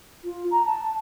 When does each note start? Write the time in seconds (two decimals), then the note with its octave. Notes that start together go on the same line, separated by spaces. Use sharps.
0.24 F4
0.51 A#5
0.66 A5